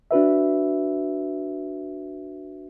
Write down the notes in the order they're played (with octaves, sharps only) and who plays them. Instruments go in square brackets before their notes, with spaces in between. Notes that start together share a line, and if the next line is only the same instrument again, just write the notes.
[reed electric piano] D4 F#4 B4 E5